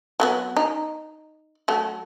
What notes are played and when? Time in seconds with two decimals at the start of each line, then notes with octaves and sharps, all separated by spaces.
0.20 F#3 A#3 B3
0.57 D#4
1.68 F#3 A3